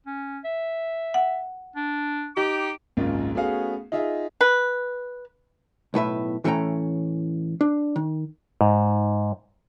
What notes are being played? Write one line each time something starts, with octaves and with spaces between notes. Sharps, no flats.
C#4
E5
F#5
D4
D#4 G4 D6
G#1 C#2 F#2 G#3 A#3 F4
A3 B3 C#4 F#4 G#4 F5
D#4 F4 G#4 E5
B4
B1 A2 B4 E5
A2 E3 A3 C#4 G5 A#5
D4
D#3
G#2